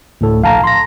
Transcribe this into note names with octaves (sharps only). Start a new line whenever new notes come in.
D2 A2 A4
A#1 F5 A5 A#5
C6 A#6